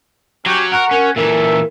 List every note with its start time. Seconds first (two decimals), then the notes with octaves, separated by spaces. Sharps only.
0.46 F#3 C#4 F#4 G4
0.72 F#4 A#4 F#5
0.91 C#4 A#4
1.16 A#2 E3 A4 A#4 E5